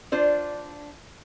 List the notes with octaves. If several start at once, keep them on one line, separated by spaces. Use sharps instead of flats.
D4 F4 C5 D5